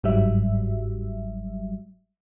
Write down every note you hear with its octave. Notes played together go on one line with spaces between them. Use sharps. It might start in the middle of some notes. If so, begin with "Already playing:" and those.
G1 G#2 F#3 G3 E5